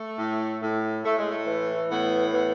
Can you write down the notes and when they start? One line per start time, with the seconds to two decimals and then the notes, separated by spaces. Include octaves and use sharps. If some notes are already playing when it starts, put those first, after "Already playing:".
Already playing: A3
0.18 A2
0.61 A2
1.03 A2 A3
1.17 G#3
1.31 A3
1.46 E3
1.88 A2 B3
2.32 E3 B3